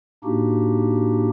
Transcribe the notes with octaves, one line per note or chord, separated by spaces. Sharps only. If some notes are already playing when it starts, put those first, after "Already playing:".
A2 A#3 D4 D#4 F#4 G4